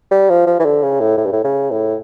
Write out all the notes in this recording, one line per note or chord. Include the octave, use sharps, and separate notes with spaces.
G3
F3
F3
E3
D3
C#3
A2
A2
G2
A2
C#3
A2